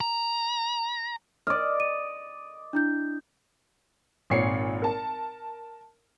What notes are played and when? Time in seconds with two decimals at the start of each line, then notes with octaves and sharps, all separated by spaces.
0.01 A#5
1.47 D5 D#5 F6
1.80 D#7
2.73 D4 E4 G6
4.30 G#1 A#2 C#5 C7 C#7
4.82 A#4 A5